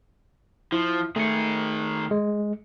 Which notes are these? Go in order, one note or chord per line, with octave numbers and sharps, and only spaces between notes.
F3 E4
D#3 A3 G#4 C#7
G#3